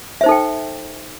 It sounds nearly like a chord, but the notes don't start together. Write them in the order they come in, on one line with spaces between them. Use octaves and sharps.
E5 C5 D#4 A4 G5